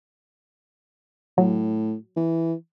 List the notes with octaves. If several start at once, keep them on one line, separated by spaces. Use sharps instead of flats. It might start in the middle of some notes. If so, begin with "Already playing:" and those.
A2 F#3
E3